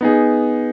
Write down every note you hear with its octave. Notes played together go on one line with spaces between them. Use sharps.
B3 D#4 G#4